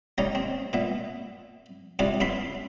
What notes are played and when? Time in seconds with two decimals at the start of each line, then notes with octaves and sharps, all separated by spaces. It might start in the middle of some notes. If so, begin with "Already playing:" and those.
0.18 D#3 G3 A#3 C#4 D#4
0.35 C4
0.73 A#2 B3 E5
1.99 C3 G3 D4 F4 G#4
2.20 F#2 B3 E4 E5 B5 C6